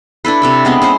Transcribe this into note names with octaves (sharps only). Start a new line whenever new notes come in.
D4 E4 A4 B4
C3 A4 E5
G#3 B3 C4
G#3 C#4 C5